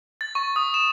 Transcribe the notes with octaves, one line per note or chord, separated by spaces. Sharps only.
A6
C#6
D#6
E7